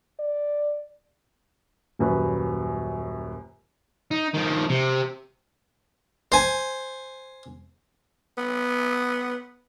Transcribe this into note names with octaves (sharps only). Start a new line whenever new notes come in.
D5
D#1 F#2 F#3 B4
D#4
D#3 F3
C3
C5 G#5
B3